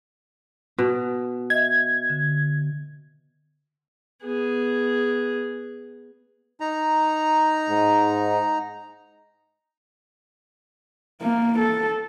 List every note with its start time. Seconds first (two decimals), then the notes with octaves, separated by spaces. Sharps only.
0.78 B2
1.50 D#5 E5 G#6
2.10 D3
4.23 B3 G#4
6.60 D#4 A#5
7.69 G#2
11.21 A#3
11.59 A4